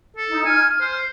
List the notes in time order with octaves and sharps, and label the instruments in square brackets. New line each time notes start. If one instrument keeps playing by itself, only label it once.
[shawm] A4
[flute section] D#4
[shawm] G#5 [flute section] F6
[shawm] C5